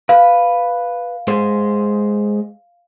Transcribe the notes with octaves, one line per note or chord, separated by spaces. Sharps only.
B4 F5
G#3 C5